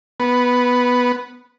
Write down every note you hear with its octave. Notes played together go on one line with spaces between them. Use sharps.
B3